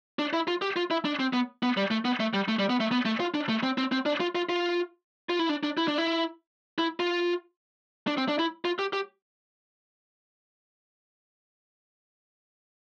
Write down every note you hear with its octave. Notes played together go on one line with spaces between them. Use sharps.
D4
E4
F4
G4
F4
E4
D4
C4
B3
B3
G3
A3
B3
A3
G3
A3
G3
B3
A3
B3
A3
F4
D4
A3
C4
C4
C4
D4
F4
F4
F4
F4
E4
D4
D4
E4
D4
E4
E4
F4
D4
C4
D4
E4
F4
G4
G4